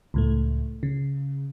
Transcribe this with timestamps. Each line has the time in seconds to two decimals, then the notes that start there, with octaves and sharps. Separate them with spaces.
0.14 C#2 A2 A3
0.83 C#3